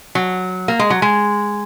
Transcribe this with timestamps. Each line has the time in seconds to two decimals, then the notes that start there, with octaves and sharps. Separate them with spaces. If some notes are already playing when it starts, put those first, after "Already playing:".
0.15 F#3
0.68 A#3
0.79 G#3
0.90 F#3
1.02 G#3